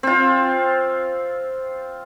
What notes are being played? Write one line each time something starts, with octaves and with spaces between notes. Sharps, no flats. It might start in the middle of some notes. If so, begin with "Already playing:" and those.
C4 F4